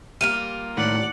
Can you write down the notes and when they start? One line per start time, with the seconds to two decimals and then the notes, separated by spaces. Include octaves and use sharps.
0.21 G3 A#3 F4 D#7
0.77 A2 D#3 D5 F#5